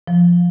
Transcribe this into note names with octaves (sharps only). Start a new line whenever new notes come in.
F3